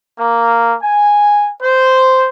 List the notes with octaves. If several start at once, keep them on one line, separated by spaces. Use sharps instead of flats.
A#3
G#5
C5